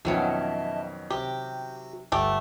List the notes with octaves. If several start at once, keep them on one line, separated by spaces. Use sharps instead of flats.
F2 B2 D#3 F#3 C#4 D#5 E5 A5
C3 F#4 G4
G1 A3 G4